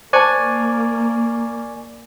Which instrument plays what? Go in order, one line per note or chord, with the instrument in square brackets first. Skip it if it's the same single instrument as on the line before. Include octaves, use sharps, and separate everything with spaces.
[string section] A#3 [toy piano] C5 A5 [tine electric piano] D5 G#5 C#6